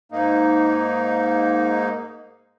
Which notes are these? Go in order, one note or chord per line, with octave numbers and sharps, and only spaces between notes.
G#2 A#3 D#4